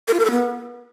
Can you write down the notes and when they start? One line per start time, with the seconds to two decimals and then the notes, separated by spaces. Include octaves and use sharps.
0.08 A#4
0.13 F4
0.19 A#4
0.25 A4
0.31 B3